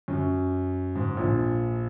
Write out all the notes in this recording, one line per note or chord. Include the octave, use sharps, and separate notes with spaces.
F#2
G#2
A#1 A#2